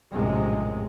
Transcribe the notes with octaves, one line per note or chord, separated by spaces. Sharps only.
A#1 F#2 A2 C3 G#3